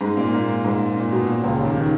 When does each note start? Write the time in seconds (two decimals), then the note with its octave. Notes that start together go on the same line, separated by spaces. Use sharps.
0.01 G#2 G#3
0.17 A#2 A#3
0.33 A#2 A#3
0.64 G#2 G#3
0.96 A#2
1.12 B2
1.28 A#2
1.44 C#2 C#3
1.60 D#2 D#3
1.75 D#3